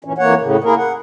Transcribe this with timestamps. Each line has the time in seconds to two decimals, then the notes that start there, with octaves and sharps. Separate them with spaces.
0.04 G2 A#2 E3 C#4
0.18 F2 E3 A#3 C#5 F#5
0.41 A2 C#3
0.64 A#3 E4 G#4 A#4
0.77 F#5